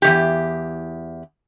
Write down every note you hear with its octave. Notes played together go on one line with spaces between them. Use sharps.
E2 E3 G4